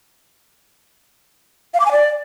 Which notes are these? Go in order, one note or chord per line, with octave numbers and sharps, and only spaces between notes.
F5
D6
G#5
D5